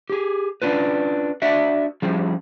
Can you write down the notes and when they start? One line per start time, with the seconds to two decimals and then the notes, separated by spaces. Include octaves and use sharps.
0.10 G4 G#4
0.62 C#4 D4 F4 B4
1.42 D4 F#4 D5 E5
2.02 F3 G3 C#4 F4 G#4